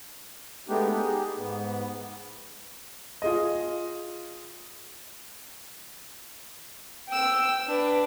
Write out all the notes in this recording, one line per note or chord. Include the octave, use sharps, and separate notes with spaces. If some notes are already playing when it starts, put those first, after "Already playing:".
G#3 A3 B3 D4 D#4 G4
D#4 G4 G#4
G#2 B3
F4 G#4 D#5
G5 E6
D4 B4